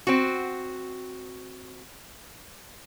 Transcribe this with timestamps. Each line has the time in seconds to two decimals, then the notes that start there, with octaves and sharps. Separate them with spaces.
0.07 C4 F#4